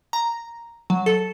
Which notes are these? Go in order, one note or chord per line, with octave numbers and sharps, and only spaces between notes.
A#5
F#3
A4